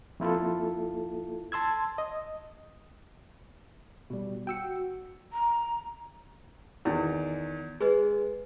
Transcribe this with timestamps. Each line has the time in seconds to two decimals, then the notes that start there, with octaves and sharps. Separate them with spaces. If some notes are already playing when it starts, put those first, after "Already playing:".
0.20 F2 A#3 E4 F4 A4
1.52 A5 C6 E6 G#6
1.98 D#5
4.10 B2 G3
4.47 F#4 G5 E6 C#7
5.33 A#5
6.85 E2 D#3 E4
7.81 G#3 G#4 B4 D#5